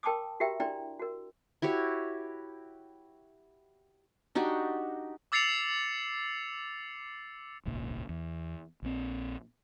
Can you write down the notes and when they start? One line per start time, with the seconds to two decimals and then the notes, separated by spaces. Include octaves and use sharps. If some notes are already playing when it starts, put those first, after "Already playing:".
0.03 A#4 G5 A5 C6 D6 D#6
0.40 F#4 G4 A#4 E5 G5 A#5
0.60 D4 E4 D5 G5 A#5 C6
0.99 F#4 A#4
1.62 E4 F#4 G4 C#5
4.35 D4 D#4 F#4 G4
5.32 D6 E6 A6 C7 C#7 F7
7.65 D#1 G#1 C#2 A#2
8.09 E2
8.82 A#1 F#3 C4